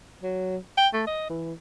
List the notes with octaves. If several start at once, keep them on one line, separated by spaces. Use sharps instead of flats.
F#3
G5
A3
D#5
E3